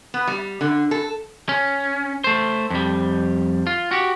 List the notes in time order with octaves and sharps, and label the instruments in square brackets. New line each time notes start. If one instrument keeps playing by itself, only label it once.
[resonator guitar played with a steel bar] B3
G3
D3
A4
[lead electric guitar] C#4
A3 C5
F2 G3
F4
F#4 G4